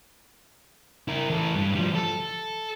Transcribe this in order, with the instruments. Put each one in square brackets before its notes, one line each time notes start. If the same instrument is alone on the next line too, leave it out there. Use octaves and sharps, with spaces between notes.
[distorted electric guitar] E4 A#4
E3 A4
G2
F3 G3
A4